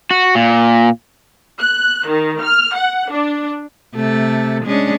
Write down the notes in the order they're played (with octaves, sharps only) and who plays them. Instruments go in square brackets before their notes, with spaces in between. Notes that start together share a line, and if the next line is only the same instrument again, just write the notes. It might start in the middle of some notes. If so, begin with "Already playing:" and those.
[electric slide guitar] F#4
A#2
[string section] F#6
D#3
F6
F#5
D4
[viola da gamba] C3 A3 A4
G#3 C#4 D4